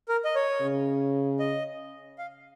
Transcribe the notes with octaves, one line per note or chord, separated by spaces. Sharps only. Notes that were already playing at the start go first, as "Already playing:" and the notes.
A#4
D#5
C#5
C#3
D#5
F5